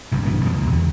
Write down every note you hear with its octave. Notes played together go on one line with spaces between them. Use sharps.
F#1 C2 G2
A#1 G2 B2 E3
F2 B2 E3 F3
C#2 B2
E2 D3